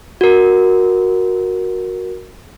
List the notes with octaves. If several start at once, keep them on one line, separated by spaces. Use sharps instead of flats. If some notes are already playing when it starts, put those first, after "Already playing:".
F#4 A#4